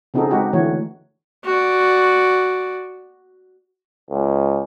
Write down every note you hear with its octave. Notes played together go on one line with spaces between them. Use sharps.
C#3 C4 D#4 F#4 G#4 A4
G#3 C4 D#4 F#4 G4
D3 E3 A3 F#4 C#5
F#4 D5
C#2